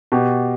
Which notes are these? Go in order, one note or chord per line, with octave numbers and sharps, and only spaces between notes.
B2 G4